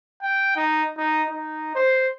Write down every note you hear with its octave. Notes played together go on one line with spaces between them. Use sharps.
G5
D#4
D#4
D#4
C5